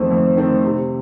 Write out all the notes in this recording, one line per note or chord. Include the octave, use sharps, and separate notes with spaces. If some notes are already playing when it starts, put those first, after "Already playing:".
Already playing: F2 D#3 A3 C4
F2
D#3 A3 C4
C3